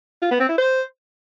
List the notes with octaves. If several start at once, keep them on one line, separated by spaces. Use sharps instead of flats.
F4
B3
C4
E4
C5